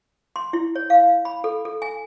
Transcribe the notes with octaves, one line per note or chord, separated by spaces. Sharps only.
C6
E4
C#5
F5
B5
A4
A4
G#5